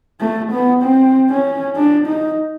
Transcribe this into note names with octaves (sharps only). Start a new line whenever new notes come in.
A3
B3
C4
C#4
D4
D#4